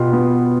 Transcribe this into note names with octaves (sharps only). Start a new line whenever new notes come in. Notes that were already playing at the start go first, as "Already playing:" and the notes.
Already playing: B2 F4 G4
B3